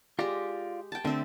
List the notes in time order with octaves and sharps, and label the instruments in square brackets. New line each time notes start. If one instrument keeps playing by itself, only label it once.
[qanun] G#3 G4 [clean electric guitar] F4 D5
[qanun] G5 A5
[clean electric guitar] D3 A3 [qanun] C4 E5